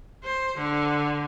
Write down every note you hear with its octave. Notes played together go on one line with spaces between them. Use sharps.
C5
D3